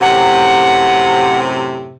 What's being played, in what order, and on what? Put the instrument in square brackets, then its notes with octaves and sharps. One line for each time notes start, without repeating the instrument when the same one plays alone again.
[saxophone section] F#2 A2 C3 [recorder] F#5